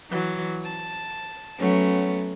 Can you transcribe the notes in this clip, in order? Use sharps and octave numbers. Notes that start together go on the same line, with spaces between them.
E3 F#3
A5
F#3 A3 B3 C#4